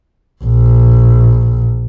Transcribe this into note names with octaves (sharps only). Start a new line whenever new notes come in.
A#1